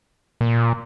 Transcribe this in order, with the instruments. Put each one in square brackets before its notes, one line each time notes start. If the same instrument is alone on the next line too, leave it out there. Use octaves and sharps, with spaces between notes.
[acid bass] A#2